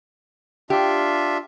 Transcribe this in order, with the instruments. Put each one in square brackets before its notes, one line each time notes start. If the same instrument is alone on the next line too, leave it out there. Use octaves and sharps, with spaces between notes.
[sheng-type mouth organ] D4 F4 E5 [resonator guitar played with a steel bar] G4